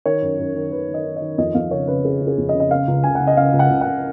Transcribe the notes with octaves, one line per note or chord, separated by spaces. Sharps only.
D#3 C#5
F#2
F#2
D#3
D#3 B4
D#3
D#5
D#3
D#5
D#3
F2 D#5
F2 F5
C#3 C#5
C#3 B4
C#3 G#4
C#3
G#4
F2
D#5
C#3
D#5
C#3 F5
C#2
C#3 G#5
F#5
C#3
D#5
C#3 F5
C#2
F#5
C#2
F#5
C#2